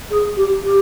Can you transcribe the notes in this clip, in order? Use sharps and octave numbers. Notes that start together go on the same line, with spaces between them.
G#4
G4
G4